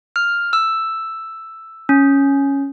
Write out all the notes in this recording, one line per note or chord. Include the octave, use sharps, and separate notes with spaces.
F6
E6
C#4